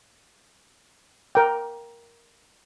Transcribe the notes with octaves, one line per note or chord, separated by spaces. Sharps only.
A#4 G5